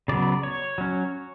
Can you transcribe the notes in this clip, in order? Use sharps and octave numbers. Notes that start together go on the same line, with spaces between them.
C#3 F#3 B3 D5
C#5
F#3 C#4